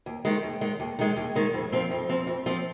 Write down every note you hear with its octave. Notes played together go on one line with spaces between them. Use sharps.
D#2
D#3 G#3
D#2
D#3 G#3
D#2
D#3 G#3
D#2
D#3 G#3
F2
F3 C4
F2
F3 C4
F2
F3 C4